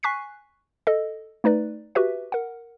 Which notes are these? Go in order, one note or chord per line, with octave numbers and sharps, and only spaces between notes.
G#5 C#6 F#6 B6 C7
A4 D#5
A3 D#4 B4 D5
F#4 G4 B4 E5
A#4 F#5